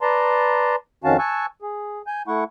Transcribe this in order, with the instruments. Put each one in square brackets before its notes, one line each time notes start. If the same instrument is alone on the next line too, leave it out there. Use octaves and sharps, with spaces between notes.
[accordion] B4 D5 A5 A#5 C6
F2 D#3 C#4 F#4 F5 A5
G#5 A5 C#6 E6 F#6
G#4
G#5 G6
A3 E4 F#5 C#6